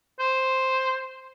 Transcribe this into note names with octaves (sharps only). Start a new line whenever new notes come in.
C5